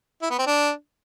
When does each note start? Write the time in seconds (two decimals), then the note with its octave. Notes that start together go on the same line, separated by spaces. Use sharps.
0.22 E4
0.30 B3
0.38 C4
0.47 D4